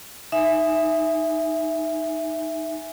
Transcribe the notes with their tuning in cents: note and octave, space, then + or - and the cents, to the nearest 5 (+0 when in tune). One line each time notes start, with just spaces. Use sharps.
D#4 +0 E5 +5 G#5 +0